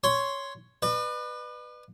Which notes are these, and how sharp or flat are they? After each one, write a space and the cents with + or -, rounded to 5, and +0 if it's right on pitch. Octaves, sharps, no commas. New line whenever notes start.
C#5 +5 C6 +0
B4 +0 D5 +45